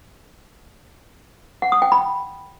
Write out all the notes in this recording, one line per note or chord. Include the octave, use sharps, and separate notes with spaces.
F#5
D#6
G5
B5